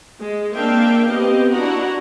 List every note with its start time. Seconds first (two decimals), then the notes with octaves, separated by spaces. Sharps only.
0.19 G#3
0.56 A#3 C4 D4 E5 F5 G5
1.11 B3 C4 G4 D#5
1.53 D4 E4 F#4 F#5 A#5